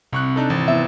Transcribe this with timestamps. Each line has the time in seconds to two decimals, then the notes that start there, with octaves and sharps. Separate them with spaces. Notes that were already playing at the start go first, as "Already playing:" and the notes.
0.13 C2 C3 C#6 F#6
0.36 D4 D#4 A4
0.50 G#1 E3
0.68 B3 E4 E5